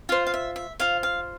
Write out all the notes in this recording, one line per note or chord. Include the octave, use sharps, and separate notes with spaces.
F4 C5 F5
F5
E5
E5
F4 C5 F5
F5